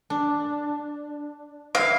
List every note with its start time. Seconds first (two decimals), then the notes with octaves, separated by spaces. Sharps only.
0.10 D4
1.75 E4 E5 F5